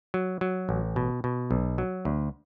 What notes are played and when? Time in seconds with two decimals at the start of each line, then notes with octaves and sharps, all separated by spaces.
0.14 F#3
0.41 F#3
0.69 A1
0.96 B2
1.24 B2
1.51 B1
1.78 F#3
2.05 D2